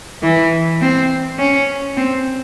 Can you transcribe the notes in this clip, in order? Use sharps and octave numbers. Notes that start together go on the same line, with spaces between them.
E3
C4
C#4
C4